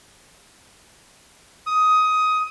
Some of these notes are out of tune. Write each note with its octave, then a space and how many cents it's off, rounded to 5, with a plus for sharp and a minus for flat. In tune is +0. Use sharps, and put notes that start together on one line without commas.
D#6 +15